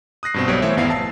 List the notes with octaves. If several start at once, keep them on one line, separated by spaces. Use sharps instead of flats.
D#6 F#6 A#6 C7
G2 B2 C4
B1 G3 B3 F#4 C#5 D7
E3 A3 C5 C#5 E5
G#1 E2 B3 E4 F5 C7
A5 E6 C7